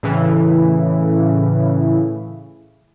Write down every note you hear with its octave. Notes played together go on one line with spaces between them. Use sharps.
A2 C#3 E3